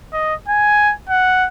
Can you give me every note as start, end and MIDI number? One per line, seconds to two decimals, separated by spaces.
0.13 0.34 75
0.48 0.93 80
1.09 1.48 78